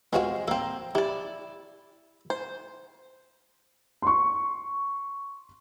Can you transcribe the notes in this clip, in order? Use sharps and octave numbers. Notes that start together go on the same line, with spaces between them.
G#3 B3 C4 F4 F#4 F5
A#3 C4 A4 F5
E4 G4 D5
C5
C6 C#6